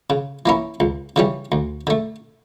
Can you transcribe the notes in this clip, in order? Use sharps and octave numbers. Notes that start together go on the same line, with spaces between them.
C#3
E3 A#3 C#4 E4
C#2
C#3 E3 G3 C#4
D2
D3 A3